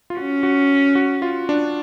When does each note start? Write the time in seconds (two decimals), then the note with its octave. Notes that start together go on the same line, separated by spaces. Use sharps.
0.10 F4
0.17 C#4 F#4
0.43 F#4
0.95 F#4
1.22 F4
1.49 D4